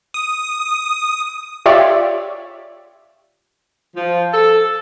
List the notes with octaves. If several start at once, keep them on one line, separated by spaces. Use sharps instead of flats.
D#6
F4 G4 C#5 D5 E5
F3
A4